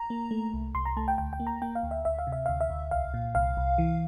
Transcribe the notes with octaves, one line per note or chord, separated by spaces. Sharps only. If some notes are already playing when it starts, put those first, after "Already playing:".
Already playing: A#5
A#3
A3
C2
C2 C6
A#5
A3 A5
G5
D2 G5
G5
A#3
A#5
A#3 G5
F5
D2
E5
D2 E5
F5
C3
E5
D2 F5
E5
D2
C2 F5
A#2
C2 F5
C2
E3